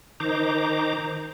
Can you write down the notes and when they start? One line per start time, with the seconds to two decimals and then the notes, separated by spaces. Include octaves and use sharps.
0.20 D#3 D#4 C5 A#5 D6